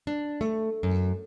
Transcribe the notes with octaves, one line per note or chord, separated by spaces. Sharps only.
D4
A3
F#2